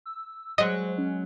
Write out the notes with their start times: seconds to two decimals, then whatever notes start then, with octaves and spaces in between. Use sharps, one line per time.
0.06 E6
0.58 F#3 G#3 C5 D#5
0.98 C#4